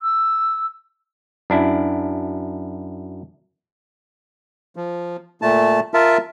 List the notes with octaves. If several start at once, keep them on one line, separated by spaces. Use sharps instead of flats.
E6
F#2 D4 E4
F3
A#2 A3 A5
F4 A#4 E5 A5